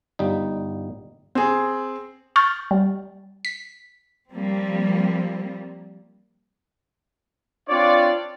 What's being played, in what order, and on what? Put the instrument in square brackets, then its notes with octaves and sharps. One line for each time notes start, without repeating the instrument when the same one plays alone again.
[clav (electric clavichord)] G1 G3 D#4
[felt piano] C4 G#4
[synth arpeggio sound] C#6 F6 G6 A6
G3
B6
[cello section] F3 G3 A#3 C4
[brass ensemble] C4 D4 F4 C#5 D5